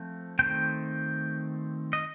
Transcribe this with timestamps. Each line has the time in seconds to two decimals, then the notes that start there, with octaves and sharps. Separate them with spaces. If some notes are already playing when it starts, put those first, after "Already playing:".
Already playing: F3 A3 C4
0.39 D#3 A3 C4 G5
1.93 D#5